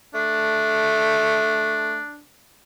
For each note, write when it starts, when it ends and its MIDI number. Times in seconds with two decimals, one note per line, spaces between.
0.14 2.00 57
0.14 2.21 62